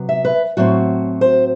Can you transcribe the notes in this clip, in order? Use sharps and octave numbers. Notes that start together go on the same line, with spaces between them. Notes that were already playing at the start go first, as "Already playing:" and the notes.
Already playing: C3 F#3 B3
E5
B4
A2 F#3 C4 F#4
C5